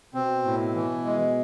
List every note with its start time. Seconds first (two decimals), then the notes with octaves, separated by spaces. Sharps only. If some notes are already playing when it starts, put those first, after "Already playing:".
0.14 B2 C4
0.45 A2
0.75 E3
1.05 G#3